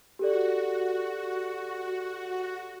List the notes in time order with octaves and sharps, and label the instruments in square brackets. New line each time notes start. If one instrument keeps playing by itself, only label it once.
[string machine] F#4 [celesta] G4 A4 D5